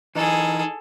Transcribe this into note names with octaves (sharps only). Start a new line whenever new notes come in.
E3 D#4 G#4 A4